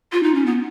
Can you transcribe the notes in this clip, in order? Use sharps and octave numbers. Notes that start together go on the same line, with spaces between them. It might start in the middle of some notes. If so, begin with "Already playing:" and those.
F4
D#4
C#4
B3